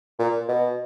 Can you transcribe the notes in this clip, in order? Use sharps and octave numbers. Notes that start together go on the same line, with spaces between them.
A#2
B2